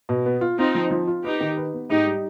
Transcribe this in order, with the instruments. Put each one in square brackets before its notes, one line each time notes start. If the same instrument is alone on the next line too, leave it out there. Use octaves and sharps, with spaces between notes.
[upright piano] B2
B3
F4
[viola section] C4 D#4 [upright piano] F4
[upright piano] F3
F3
F4
[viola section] D#4 G4 [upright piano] B4
[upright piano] D#3
B4
B3
[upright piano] G#2 [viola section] D#4 G4
[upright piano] G3